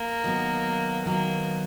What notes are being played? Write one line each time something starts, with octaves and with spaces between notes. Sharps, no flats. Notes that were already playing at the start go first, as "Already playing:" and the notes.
Already playing: A#3
D#3 F#3 B3
D#3 F#3 A#3 B3